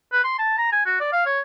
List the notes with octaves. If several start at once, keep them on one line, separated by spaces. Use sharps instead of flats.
B4
C6
A5
A#5
G#5
F#4
D5
F5
C#5